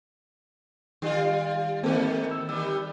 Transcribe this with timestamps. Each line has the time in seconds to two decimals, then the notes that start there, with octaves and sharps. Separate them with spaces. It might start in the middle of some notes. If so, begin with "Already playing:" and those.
1.02 D#3 G3 F4
1.83 G#2 D#3 A#3 C4 A4
2.31 E6
2.49 D#3 G3 E6